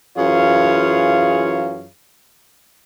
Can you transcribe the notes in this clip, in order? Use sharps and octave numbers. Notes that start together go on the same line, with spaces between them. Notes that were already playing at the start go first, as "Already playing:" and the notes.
F#2 E3 F4 G#4 C#5 F5